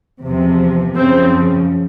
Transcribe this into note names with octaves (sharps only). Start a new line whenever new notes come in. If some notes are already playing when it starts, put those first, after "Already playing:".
E2 C3 F3
F#2 C#3 F3 C4